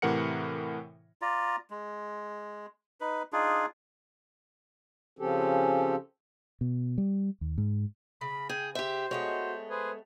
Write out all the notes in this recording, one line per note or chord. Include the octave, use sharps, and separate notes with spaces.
A2 C3 E3 A#4 F#5 C#7
F4 D5 A#5
G#3
D#4 B4
D4 D#4 F4 G#4
C#3 F3 C4 C#4 G4 A4
B2
G3
D#2
G#2
C#3 B5
G#4 G5
G4 C5 E5
G#3 A3 B3 F#4 C#5
G#4 B4 C5